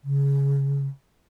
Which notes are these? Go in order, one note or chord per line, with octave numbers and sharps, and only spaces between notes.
C#3